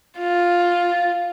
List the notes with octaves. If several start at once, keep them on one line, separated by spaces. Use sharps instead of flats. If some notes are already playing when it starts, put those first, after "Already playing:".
F4